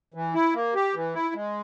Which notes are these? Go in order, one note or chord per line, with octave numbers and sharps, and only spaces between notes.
E3
E4
A#3
G4
E3
E4
G#3